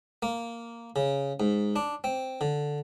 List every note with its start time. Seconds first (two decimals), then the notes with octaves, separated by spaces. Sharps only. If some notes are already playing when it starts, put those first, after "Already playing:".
0.22 A#3
0.96 C#3
1.40 G#2
1.76 D4
2.04 C4
2.41 D3